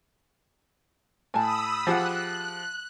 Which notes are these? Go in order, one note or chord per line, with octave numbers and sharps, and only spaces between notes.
A2 G#5 A5 B5 D#6 E6
F3 G4 G#4 F#5 F#6